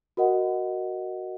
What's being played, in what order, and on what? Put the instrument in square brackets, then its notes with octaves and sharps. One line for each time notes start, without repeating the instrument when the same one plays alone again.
[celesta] F#4 A#4 D#5 F#5